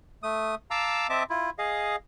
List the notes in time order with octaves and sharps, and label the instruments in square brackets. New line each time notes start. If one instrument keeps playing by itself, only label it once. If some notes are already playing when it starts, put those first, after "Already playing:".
[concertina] A3 D#6
F5 A5 A#5 D6 E6
C4 D#5 E5 A5 D6
E4 F4
G#4 D#5 F5